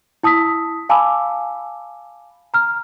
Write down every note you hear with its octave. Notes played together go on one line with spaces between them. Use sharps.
E4 A5 D#6 E6 B6
F5 G#5 A5 B5 D6 E6
A#5 F6